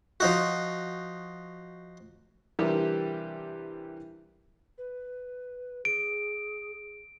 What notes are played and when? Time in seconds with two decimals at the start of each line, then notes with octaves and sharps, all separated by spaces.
0.20 F3 D#4 F#4
2.59 C3 E3 G3 D4 G4 A#4
4.78 B4
5.85 G#4 D7